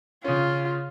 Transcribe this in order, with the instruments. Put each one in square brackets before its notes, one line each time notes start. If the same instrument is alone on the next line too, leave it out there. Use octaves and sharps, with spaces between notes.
[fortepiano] C#3 C#4 [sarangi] F4